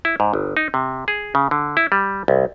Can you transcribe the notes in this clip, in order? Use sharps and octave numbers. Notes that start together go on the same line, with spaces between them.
E4
G#2
G1
D#4
C3
G#4
C#3
D3
E4
G3
C2